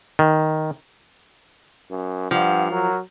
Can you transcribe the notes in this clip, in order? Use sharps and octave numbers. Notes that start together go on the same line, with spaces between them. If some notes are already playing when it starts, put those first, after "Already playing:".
D#3
F#2
G2 F3 F#5
F#3 A#4